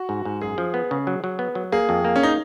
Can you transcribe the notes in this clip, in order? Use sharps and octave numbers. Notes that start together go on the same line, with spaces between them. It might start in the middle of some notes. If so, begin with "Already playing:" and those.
Already playing: F#4
G#2
G#2
F#2 G#4
F3
B3
C#3
F#3
F#3
B3
F#3
A#3 G#4
F2
A#3
C#4
D#4